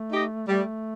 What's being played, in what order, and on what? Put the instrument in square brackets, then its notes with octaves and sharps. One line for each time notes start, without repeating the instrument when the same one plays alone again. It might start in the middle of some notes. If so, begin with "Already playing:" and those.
Already playing: [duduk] A3
[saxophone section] D#4 G4 D#5
[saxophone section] G3 [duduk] A3